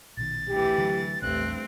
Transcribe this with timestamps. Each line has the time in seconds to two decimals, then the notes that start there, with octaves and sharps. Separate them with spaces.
0.17 A#1 B2 D#3 A6
0.49 D2 E3 G4
0.78 D3 F#3
1.22 A#1 E2 G2 A3 C4 F#6